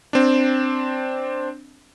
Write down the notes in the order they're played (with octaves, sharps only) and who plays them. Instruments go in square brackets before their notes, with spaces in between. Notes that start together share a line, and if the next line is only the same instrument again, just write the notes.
[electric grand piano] C4 D4